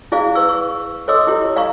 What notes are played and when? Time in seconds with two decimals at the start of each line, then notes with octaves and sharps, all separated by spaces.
0.12 E4 G#4 D5 F5
0.35 B4 C#6 E6
0.49 C#6
1.08 A4 C#5 D#5 C6 D6 E6
1.27 E4 G4 C#5
1.56 D5 F5 A#5 C#6